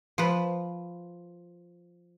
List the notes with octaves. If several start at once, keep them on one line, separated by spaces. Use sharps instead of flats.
F3 B4